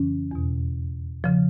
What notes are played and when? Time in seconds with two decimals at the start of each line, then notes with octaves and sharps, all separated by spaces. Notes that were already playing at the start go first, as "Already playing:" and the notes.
Already playing: F2 C#3 E3 C#4
0.31 E2 B2
1.24 C#3 F3